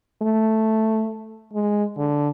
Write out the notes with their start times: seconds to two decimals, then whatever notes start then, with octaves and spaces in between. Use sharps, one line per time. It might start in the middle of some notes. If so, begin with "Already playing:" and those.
0.22 A3
1.53 G#3
1.98 D3